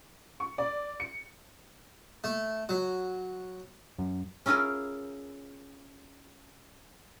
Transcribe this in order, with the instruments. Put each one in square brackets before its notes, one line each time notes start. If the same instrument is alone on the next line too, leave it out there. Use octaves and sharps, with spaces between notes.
[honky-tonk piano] C#6
D5
C#7
[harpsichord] A3
F#3
[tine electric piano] F#2
[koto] C#4 E4 F4 G#4 A#4